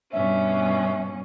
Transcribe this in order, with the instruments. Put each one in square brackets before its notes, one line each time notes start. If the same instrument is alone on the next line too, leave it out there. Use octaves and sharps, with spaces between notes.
[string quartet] G2 B2 C#4 [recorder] E5